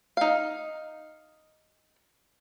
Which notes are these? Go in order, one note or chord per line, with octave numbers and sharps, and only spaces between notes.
D#4 F5